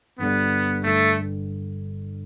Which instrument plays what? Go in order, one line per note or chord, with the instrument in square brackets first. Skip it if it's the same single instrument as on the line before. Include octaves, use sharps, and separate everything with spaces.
[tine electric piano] G1 G2 D3 G3 [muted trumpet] B3
[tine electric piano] G1 G2 D3 [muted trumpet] A3